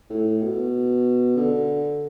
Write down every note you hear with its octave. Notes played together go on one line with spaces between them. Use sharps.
A2
B2
D3